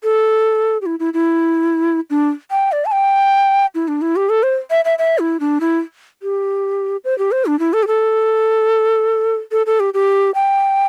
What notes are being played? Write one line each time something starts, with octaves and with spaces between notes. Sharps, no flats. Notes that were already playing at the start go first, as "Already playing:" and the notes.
A4
G4
E4
E4
E4
D4
G5
D5
A5
G5
E4
D4
E4
G4
A4
C5
E5
E5
E5
E4
D4
E4
G4
C5
G4
C5
D4
E4
A4
G4
A4
A4
A4
G4
G4
G5